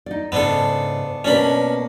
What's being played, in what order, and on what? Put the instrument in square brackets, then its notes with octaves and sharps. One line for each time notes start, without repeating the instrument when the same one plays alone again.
[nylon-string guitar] D#4 D5
[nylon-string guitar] G#2 C#3 [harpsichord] B3 D4 A4
[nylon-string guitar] B2 A#3 D5 [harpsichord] C#4 D4 B5